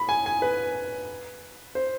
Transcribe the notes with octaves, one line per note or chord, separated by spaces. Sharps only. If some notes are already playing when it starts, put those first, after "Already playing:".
Already playing: B5
G#5
G#5
B4
C5